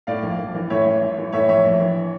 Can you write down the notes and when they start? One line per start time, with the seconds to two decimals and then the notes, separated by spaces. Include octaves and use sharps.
0.07 A2 D5 F5
0.23 A#1
0.38 A#1
0.54 E3
0.70 A2 C#5 E5
0.86 A1
1.02 A1
1.18 E3
1.32 A2 C#5 E5
1.48 A#1 C#5 E5
1.65 A#1
1.80 E3